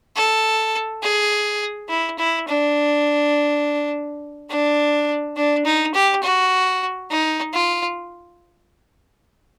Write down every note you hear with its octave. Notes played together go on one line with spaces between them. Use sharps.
A4
G#4
E4
E4
D4
D4
D4
D#4
G4
F#4
D#4
F4